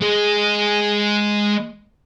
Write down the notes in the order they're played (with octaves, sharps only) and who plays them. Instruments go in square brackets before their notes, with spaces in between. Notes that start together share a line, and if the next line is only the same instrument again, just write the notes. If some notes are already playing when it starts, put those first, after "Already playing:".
[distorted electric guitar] G#3 G#4